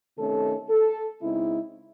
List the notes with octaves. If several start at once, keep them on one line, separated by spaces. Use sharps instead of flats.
C3 D#3 A3 C#4 A4
A4
C#3 G#3 C4 D#4 E4